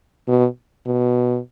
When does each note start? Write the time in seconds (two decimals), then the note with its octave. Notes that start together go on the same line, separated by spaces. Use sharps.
0.28 B2
0.86 B2